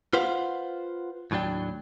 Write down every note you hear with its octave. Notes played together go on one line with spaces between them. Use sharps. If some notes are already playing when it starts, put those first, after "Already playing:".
F4 B4 C5 F5 F#5
D#2 A2 F#3 D4 G5